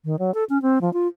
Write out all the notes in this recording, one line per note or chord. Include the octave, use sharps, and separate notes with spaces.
D#3
F#3
A4
C#4
C4
F3
F4